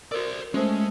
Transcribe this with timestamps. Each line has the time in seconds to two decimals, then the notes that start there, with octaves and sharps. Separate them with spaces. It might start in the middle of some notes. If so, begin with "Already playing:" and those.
0.12 F#4 A4 A#4 C5 D5
0.54 G#3 A3 C#4 F#4 A4 C5